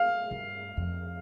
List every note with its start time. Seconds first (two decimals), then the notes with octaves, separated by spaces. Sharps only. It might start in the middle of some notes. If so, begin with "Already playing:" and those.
Already playing: F5
0.31 G2
0.77 F2